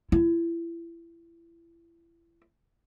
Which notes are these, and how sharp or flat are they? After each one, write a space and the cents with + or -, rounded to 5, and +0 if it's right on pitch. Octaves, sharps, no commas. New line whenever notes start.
E4 +30